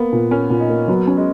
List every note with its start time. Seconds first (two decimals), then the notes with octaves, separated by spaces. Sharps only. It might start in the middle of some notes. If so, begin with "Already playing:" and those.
Already playing: A#3 B3
0.12 A#2
0.31 C#4 A#4
0.50 A#2
0.60 D#4
0.70 A#3
0.88 F#3 B3
1.07 C#4
1.17 G#3